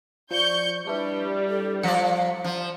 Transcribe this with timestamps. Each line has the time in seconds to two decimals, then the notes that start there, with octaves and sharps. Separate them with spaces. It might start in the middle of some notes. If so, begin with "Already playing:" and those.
0.31 F3 D5 C#6 G6 C#7
0.87 G3 D4 E4 B4
1.50 A4
1.83 F3 D5 F5 A#5 B6 C#7
2.44 F3